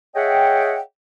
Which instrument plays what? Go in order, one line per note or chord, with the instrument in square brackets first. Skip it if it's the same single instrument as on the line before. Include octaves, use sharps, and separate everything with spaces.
[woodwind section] G#4 C#5 D#5 E5 F#5 G5